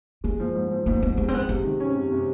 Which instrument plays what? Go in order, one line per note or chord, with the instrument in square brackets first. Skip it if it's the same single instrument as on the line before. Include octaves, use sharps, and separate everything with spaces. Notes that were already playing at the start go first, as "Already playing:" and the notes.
[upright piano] G#3 [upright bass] A#3
[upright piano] F3
G#2
F3
[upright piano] G#2 [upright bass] A#3
[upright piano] G#2 [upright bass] B3
[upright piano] G#3 [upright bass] B3
[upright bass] C4
[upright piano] G#3 [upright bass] B3
[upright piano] C3 [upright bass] C4
[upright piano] D#3
C#4
C3
C3